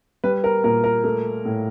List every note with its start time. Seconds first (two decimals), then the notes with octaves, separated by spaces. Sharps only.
0.24 G3 B4
0.44 A#4
0.64 A#2 A#4
0.84 A#4
1.04 A3
1.45 A2